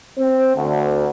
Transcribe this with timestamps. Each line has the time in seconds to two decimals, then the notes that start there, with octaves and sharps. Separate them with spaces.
0.18 C4
0.55 D2